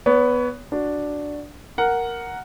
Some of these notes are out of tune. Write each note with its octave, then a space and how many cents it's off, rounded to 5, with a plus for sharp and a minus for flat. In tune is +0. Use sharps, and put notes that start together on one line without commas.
B3 +0 C#5 +30
D4 +0 F#4 +0
A#4 +0 F#5 +0